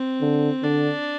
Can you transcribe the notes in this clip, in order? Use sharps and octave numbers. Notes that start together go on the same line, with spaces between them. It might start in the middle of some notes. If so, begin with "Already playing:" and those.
Already playing: C4
D3
D3 D4